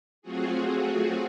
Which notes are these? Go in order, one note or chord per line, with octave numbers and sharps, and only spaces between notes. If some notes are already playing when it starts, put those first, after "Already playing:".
F#3 A3 C4 F4 F#4 G#4